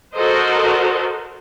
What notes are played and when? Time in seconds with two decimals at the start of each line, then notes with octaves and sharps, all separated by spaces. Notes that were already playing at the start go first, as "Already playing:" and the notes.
0.16 F#4 A4 A#4 C5 D#5